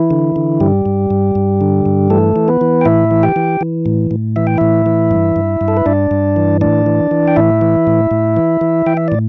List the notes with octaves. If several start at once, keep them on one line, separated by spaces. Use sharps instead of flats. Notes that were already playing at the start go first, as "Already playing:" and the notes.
Already playing: E3 E4
D3
D3
G2 G3 G4
G2
G2
G2
D3
G2
E3 A3 A4
E3
B3 B4
E3
G5
A2 E4 E5
E3
G4 G5
E3
E3
A2
A2
E3 E5
G5
A2 E4 E5
E3
G2
G2
G2
A4
B4
G2 D4 D5
G2
E3
A2 D4 D5
E3
E3
G5
A2 E4 E5
E3
A2
A2
E3
E3
E3 G5
E5
A2 D5